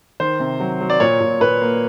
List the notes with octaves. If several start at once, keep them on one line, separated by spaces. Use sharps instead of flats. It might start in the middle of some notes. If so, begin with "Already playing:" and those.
D#3 C5
C3
F#3
F#3
D5
A#2 C#5
A#2
A#2 B4
A#3